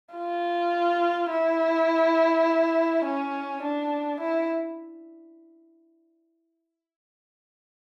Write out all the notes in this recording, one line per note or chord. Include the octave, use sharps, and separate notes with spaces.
F4
E4
C#4
D4
E4